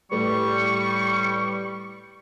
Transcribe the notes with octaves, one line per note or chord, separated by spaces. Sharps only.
A2 G3 A3 B4 C#6